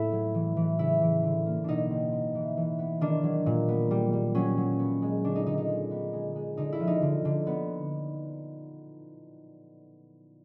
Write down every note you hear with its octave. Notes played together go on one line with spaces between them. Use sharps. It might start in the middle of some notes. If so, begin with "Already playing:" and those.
Already playing: A2 A3 E4
F#3
E3
E3
C#3 E4
E3
D3
A#3
B2 D4 D#4
C4
C4
E3
E3
B3
D#3 D4
F#3
A#2
B3
G3
G3
F#3 C#4
F#3
B3
G#3
D3 D4
D#4
D3 D#4
D#4
G#3
B3
G#3
G#3
D3 D#4
E4
F3
D#4
D3
D3
B3